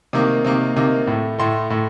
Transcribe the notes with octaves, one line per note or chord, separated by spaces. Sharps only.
C3 D#3 A#3
C3 D#3 A#3
C3 D#3 A#3
A2 A3
A2 A3 C6
A2 A3